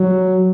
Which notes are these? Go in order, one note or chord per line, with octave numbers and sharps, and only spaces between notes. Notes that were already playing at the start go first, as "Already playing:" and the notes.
Already playing: F#3